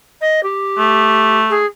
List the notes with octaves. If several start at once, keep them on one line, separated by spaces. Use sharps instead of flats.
D#5
G4
A3
G#4